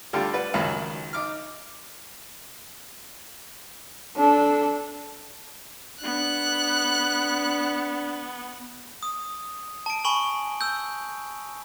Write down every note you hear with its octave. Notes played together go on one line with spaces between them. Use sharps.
D3 G3 A3 F4 A4 G5
B4 D5 F#5
G#1 C#2 D#3 F#3 B5
D#4 D6 F6
D4 A4
B3 D4 F#6
D#6
A5 D7
G#5 B5 C#6 F#7
E6 G6